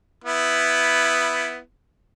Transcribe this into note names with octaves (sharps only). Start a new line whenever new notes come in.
B3 E4